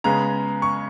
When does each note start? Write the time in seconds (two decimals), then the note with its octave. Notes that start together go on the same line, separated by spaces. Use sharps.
0.04 C#3 G#3 B3 A#5
0.62 C#6